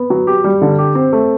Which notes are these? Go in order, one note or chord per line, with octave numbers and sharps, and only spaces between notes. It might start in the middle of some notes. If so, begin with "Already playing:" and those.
Already playing: B3
F#3
G4
G3
D3
G4
C4
A3